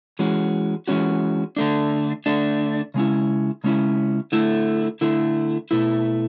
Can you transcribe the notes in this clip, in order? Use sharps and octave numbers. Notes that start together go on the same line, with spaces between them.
E3 G#3 C#4 F#4
E3 G#3 C#4 F#4
D3 A3 D4
D3 A3 D4
C#3 G#3 C#4 E4
C#3 G#3 C#4 E4
D3 A3 E4
D3 A3 E4
B2 A3 E4